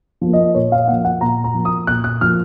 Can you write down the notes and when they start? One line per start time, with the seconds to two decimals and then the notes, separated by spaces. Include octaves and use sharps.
0.21 F3
0.27 A#3
0.33 D#5
0.55 A#2 C#5
0.72 F5
0.88 F3 A#3 F#5
1.05 F#5
1.21 A#2 A#5
1.44 A#5
1.54 F3 A#3
1.65 D#6
1.87 A#2 F#6
2.04 F#6
2.21 F3 A#3 F6